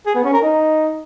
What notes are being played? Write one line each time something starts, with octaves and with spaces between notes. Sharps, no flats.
G#4
B3
C#4
A#4
D#4